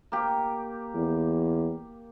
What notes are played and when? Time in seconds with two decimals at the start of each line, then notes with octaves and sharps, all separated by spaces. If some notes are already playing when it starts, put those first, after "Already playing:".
0.12 A#3 G4
0.95 E2